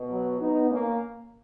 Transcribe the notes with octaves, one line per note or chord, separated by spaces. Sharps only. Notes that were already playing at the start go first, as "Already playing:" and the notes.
Already playing: B2
F#3
B3 D#4
A#3 C#4